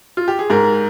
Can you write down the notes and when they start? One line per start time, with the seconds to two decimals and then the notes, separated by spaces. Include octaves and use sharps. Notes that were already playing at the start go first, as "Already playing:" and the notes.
0.17 F4
0.28 G4
0.39 G#4
0.50 G#2 A#4